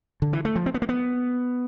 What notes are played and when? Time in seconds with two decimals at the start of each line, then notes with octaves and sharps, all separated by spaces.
0.22 D3
0.33 E3
0.45 A3
0.56 F3
0.66 C4
0.74 B3
0.82 A#3
0.89 B3